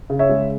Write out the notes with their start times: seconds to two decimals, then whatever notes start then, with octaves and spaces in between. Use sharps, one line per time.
0.10 C#3
0.19 C#5 E5
0.29 G#3